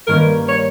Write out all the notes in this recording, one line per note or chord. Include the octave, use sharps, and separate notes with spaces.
G2 D#3 A#3 C#4 A#4
C#5